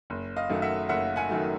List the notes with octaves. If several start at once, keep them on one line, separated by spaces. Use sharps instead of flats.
F#1
D#5 F5
F#2 D#3 F#3 A3
E5 F#5
F#1 E5 F#5
F#5 G#5
F#2 D#3 F#3 A3